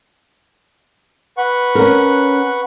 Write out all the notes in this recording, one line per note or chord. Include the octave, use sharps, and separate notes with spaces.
B4 F#5 C#6
C#4 A#4